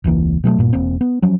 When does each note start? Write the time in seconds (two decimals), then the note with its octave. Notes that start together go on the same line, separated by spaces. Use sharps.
0.04 E1 C#2 E3 A#3
0.44 B2 F#3 G3 A3
0.59 G2 A#2
0.73 E1 A#3 C4
1.01 B3
1.22 F3 F#3 C#4